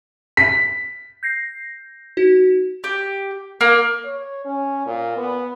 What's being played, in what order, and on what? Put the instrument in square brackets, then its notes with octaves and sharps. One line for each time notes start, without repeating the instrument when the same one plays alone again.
[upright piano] B6
[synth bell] G6 A#6 C7
D#4 F#4
[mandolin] G4
A#3
[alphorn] C#5
C#4
A#2
B3